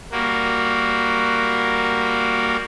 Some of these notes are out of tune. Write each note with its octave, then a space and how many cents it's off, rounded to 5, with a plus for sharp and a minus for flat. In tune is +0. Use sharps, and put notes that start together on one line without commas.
G3 +10 A#3 +0 F#4 +0